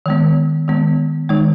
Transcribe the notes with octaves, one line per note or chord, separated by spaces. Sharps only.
D#3 G#3 B3
D#3 G#3 B3
D#3 G#3 D#4